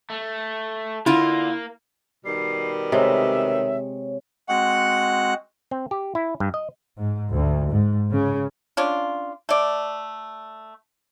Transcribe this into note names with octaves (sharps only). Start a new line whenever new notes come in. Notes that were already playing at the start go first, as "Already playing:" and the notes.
A3
D3 A#3 E4 F4
B2 D#3 G3 C7
C3 G#3 C#5 E5
G#3 C4 F#4 F#5
C4
G4
E4
G2
D#5
G#2
D2
G#2
C#3
C#4 D4 F4
A3 D5